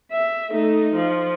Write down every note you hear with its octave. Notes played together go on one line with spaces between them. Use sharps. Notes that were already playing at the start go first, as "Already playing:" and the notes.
E5
A3 D#4
F3